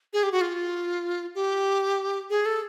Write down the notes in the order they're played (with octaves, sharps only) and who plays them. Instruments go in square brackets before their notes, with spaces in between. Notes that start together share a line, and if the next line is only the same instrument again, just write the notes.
[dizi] G#4
G4
F#4
F4
G4
G#4
A4